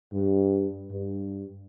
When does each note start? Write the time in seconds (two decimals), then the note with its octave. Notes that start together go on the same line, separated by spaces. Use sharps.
0.12 G2
0.90 G2